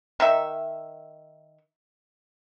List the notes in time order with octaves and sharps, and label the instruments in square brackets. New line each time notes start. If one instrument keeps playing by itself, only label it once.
[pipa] D#3 D#4 E5